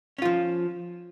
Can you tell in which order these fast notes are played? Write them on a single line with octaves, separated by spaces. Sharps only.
C#4 F4 F3